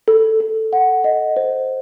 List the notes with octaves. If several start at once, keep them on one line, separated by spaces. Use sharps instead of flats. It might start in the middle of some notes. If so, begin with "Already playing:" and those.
A4
A4
F#5
D#5
C5